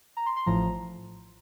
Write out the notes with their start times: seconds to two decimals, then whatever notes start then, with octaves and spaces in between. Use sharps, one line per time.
0.17 A#5
0.26 C6
0.36 C6
0.46 A1 A2 F3 A#5